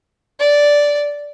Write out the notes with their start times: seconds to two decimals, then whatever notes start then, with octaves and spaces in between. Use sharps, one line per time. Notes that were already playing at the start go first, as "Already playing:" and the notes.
0.39 D5